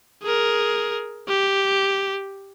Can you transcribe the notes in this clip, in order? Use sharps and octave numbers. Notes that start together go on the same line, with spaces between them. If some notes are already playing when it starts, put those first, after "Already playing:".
G#4 A#4
G4